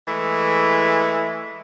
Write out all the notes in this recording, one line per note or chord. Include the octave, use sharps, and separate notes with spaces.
E3 G#3 A3